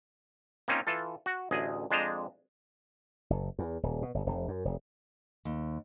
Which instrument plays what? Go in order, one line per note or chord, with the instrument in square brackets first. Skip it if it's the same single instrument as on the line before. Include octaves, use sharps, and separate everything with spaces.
[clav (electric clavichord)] A#3 C4 C#4 D#4 F4 A#4
E3 F4 A4
F#4
A1 D2 G#4 D#5
F2 G#3 D4 C5 D#5 A#5
[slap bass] F#1
E2
D#1
B2
G1
F1
F#2
F1
[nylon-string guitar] D#2